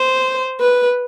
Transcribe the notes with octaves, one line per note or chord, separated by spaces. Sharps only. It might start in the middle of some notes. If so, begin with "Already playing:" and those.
Already playing: C5
B4